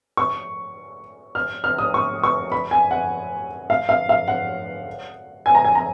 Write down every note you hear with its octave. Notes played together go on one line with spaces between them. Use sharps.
C#6
F6
F6
D#6
C#6
C#6
B5
G#5
F#5
F5
F5
F5
F#5
G#5
A#5
G#5
A#5